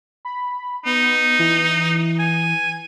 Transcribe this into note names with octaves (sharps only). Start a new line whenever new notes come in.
B5
B3 D#4
E3
G#5